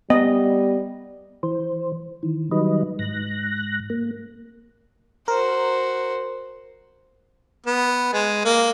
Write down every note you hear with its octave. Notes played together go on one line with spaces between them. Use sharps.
G3 B3 D#5
E3 C5
D#3 E3
D#3 F#3 G3 D#4 B4 D#5
G#2 F#6 A#6
A#3
F#4 A#4 C5
B3
G#3
A#3